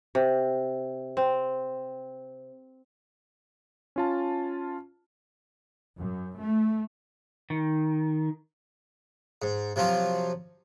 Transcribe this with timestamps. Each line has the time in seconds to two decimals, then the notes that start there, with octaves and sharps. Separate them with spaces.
0.15 C3
1.17 C4
3.96 C#4 F4 A5
5.98 F#2
6.39 A3
7.50 D#3
9.42 G#2
9.76 C3 F3 F#3 F4